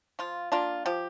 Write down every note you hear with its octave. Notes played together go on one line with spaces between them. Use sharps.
F3 F4
A#3 D4 F4
F3 G4